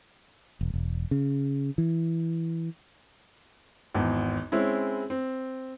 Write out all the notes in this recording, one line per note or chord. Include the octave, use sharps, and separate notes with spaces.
E1
E1
C#3
E3
G#1 E2
G#3 C4 C#4 E4
C4